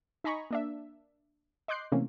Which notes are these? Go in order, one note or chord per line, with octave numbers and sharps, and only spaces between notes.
D#4 D#5 G#5 A#5 B5 C#6
A#3 D4 E5
D#5 C6 D6 F#6 G6 C7
C3 E3 A3 A#3 C4 C#4